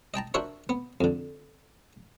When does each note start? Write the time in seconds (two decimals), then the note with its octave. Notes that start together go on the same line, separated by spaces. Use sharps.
0.14 D#5 G5 A5 A#5
0.34 D4 F#4 A#4 C5 C#5 E5
0.69 B3
1.01 F2 D3